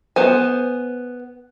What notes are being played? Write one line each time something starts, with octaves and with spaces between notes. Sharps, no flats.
B3 C5 G#5